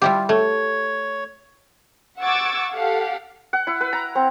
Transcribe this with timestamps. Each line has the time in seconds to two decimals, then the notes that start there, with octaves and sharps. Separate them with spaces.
0.02 G3 E4 F4 G4
0.29 A3 C#5
2.22 F#5 C#6 D6 E6 G#6 A6
2.72 G4 A4 F5 F#5
3.53 F#5
3.67 E4
3.81 B4
3.93 A#5
4.15 C4